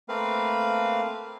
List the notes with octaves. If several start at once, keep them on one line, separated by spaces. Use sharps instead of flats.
A3 A#3 C4 B4 F5